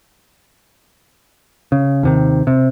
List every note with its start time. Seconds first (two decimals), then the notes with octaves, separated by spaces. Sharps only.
1.72 C#3
2.03 D#2 C3 D#3
2.47 C3